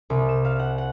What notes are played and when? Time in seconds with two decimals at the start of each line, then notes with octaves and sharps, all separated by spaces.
0.10 C2
0.29 E7
0.45 F5
0.60 F#5
0.78 F#5